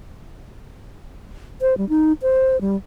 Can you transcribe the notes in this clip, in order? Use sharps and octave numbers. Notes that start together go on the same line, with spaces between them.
C5
G3
D#4
C5
G3